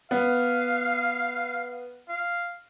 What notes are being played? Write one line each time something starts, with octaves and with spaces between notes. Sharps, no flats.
B3 F5
F5